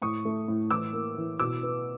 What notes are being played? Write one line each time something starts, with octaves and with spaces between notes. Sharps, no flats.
A2 C#6 D#6
A3
A2
E3 D6 E6
A#3
E3
B2 D6 E6
B3